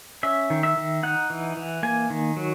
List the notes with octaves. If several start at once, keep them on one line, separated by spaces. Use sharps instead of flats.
C#4 E5
D#3
E5
D#3
D#4 F#5
E3
E3
A#3 G#5
D#3
F#3